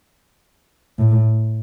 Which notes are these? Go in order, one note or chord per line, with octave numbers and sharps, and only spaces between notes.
A2